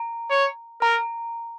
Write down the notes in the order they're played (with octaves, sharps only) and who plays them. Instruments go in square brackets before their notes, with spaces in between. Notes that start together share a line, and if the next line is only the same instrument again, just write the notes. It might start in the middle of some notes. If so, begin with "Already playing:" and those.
Already playing: [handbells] A#5
[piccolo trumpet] C#5
[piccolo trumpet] A#4 [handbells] A#5